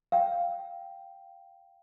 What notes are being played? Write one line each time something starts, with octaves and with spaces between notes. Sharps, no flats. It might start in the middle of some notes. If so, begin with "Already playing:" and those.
F5 G5